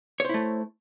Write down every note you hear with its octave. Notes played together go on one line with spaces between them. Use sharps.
A3 E4 C5 C#5